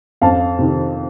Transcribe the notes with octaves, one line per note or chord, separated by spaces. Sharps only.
F2 F5 A5
C3 D#3